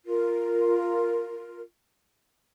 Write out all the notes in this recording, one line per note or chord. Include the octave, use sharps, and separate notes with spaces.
F4 A#4